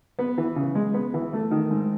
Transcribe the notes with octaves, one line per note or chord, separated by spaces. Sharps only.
B3
E3
C#3
G#3
B3
E3
A3
D#3
G#2